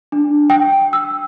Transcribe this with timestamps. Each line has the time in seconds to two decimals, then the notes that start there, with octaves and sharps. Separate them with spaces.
0.12 D4
0.50 G5
0.93 E6